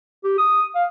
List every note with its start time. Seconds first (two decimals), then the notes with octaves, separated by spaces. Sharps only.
0.24 G4
0.38 D#6
0.75 F5